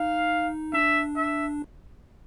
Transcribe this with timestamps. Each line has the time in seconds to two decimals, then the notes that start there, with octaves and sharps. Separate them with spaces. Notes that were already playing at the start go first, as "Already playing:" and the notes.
Already playing: D#4 F5
0.73 D4 E5
1.16 E5